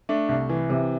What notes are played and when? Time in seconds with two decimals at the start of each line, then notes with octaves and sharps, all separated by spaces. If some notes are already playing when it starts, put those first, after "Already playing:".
0.09 A3 D4
0.29 C2
0.49 E3
0.70 C3